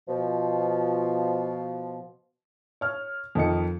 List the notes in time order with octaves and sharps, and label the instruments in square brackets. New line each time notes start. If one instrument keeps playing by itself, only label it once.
[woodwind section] B2 F3
[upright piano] C#5 F6
F2 D#3 D#5 C#7